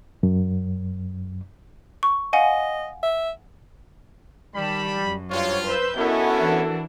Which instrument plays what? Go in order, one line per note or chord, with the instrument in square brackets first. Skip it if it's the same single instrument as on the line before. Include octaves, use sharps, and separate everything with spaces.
[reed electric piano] F#2
[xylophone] C#6
[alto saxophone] D#5 [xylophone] F5 F#5 G#5
[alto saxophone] E5
[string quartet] D#3 A5 [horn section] G3 B5
[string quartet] F#2
[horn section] G2 F4 [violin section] F#4 C5 [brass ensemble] C#5
[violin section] B4 E6 G6 [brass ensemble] C5
[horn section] B3 C#4 E5 [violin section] E4 A#4 [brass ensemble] F#4 A4 [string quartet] D#5
[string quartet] E3 D4